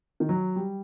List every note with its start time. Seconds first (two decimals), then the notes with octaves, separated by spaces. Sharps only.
0.20 D#3
0.29 F#3
0.56 G3